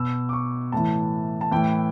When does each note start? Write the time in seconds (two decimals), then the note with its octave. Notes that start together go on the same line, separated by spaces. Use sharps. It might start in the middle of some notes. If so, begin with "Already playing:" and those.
Already playing: B2 E6
0.29 D6
0.33 C#6
0.72 A2 E3 A5
1.41 A5
1.51 A2 E3 G5